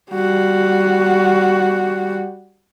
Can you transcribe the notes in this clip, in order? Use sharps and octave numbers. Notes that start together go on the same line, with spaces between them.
G3 F#4